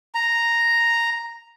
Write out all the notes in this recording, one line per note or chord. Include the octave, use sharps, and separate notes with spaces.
A#5